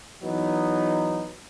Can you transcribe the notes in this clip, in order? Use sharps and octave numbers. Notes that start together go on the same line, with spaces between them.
E3 F#3 B3 D#4